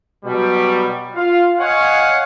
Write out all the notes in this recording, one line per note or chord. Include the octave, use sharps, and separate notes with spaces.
B2 F#3 G3
F4 F5
C#5 D#5 F5 F#5 G#5